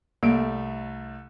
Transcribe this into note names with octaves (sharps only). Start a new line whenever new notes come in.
C2 A3 A#3 D7